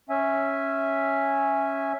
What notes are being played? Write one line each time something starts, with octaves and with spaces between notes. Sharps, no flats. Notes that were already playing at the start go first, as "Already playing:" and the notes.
C#4 E5 G#5